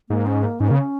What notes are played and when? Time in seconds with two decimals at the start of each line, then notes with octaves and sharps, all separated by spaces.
0.09 G#2 A#3
0.26 C#4
0.43 A#3
0.60 G#2 C#4
0.68 C#3 A#3
0.76 C#4